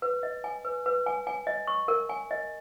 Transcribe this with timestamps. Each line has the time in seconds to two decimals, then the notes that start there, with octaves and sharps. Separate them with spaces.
0.02 B4
0.23 D#5
0.44 G#5
0.65 B4
0.86 B4
1.06 G#5
1.27 G#5
1.47 D#5
1.67 C#6
1.88 A#4
2.09 G#5
2.31 D#5